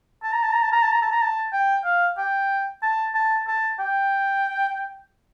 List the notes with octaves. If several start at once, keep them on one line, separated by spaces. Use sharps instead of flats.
A5
A#5
A5
A#5
A5
A#5
A5
A#5
A5
A#5
A5
G5
F5
G5
A5
A5
A5
G5